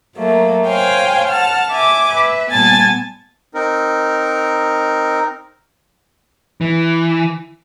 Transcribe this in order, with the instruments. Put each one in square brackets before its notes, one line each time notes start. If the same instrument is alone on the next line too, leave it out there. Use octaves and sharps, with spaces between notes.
[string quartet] F#3 A3 A#3
C5 C#5 F5 G5 G#5
F#5 A5 F6
E5 G#5 D6
B4 E5
A#2 G3 B3 G#5 A5 A6
[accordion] C4 D#4 A#4
[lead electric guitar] E3